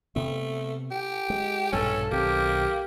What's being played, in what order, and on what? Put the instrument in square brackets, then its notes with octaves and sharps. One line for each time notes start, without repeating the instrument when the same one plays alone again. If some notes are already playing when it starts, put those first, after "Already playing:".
[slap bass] C3 B3 [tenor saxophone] A3
[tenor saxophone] G4
[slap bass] G#3
[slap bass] A#1 G2 B2 [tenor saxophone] C#4 [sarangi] A4
[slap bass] B1 D#3 C4 [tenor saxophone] A#3 [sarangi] G4